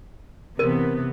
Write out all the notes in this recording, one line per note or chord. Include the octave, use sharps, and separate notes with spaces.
C3 E3 B3 A#4